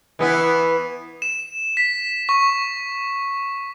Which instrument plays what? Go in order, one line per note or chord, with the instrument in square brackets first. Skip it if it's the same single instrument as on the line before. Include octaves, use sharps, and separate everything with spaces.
[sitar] E3 B3 E4
[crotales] E7
B6
C#6